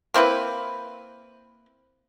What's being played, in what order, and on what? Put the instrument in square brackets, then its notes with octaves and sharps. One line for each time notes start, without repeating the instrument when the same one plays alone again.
[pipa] A#3 C4 E4 B4